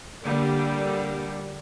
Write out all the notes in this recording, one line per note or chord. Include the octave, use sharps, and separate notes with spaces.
D3 G3 A#3